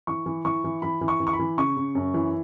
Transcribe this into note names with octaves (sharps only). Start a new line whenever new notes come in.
E3 C#6
E3
E3 C#6
E3
E3 B5
E3
C#6
E3
C#6
B5
E3
C#3 C#6
C#3
F#2
E3